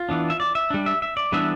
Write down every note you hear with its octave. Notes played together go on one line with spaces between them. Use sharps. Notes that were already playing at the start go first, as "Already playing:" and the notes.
Already playing: F4
E3 B3 D4
E5
D5
E5
G3 D4
E5
E5
D5
E3 G3 B3 D4 E5